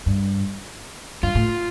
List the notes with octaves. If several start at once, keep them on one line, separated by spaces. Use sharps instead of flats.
G2
G2 F4
A2